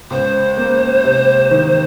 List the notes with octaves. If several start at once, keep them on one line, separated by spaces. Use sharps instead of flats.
C#2 C5
A#3
C3
D#3